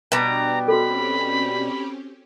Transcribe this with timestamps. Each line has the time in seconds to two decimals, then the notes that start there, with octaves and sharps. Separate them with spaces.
0.12 B2 G3 D4 B4 A5 A#5
0.68 C4 C#4 F#4 G4 A4 B5